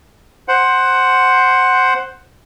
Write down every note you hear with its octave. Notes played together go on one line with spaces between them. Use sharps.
C5 F#5